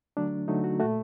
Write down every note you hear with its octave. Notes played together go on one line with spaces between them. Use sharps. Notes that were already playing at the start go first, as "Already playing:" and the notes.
D3 F#3 A3 D4
D3 F#3 A3 D#4
F#4
A#2 A3 F#4